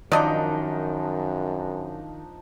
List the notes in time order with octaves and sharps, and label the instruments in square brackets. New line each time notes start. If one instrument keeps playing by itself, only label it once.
[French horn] F#2 [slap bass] D#3 [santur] F3 D4 D#4 [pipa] D5 D#5